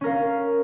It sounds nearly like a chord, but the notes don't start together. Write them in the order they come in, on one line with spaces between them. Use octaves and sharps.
C#4 A#4 F5